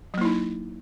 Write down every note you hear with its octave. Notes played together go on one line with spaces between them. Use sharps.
F#3 A#3 D#4 E4